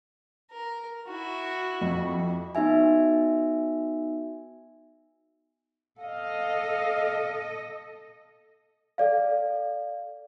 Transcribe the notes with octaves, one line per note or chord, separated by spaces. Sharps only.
A#4
E4 F#4
F2
B3 D#4 F#4 E5 G#5
A4 D#5 F5
A4 D5 F5